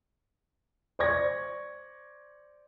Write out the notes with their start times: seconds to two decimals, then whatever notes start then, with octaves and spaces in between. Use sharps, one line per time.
0.99 C5 D5 C#6 G#6 A#6